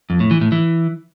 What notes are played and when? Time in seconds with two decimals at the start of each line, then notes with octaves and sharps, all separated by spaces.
0.10 F2
0.20 A2
0.31 E3
0.41 A2
0.52 E3